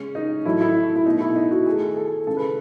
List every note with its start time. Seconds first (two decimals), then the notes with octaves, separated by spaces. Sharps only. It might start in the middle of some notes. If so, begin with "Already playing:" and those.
Already playing: C#3 G#3 C#4
0.15 D#4
0.45 A2 F#3 A3 E4
0.61 E4
0.96 E4
1.06 B2 A3 D#4
1.21 E4
1.36 D#4
1.51 F#4
1.66 D#3 A3 G#4
1.97 A4
2.27 C#3 G#3 A4
2.37 B4